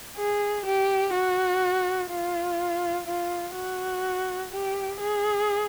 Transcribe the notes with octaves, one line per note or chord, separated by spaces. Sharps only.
G#4
G4
F#4
F4
F4
F#4
G4
G#4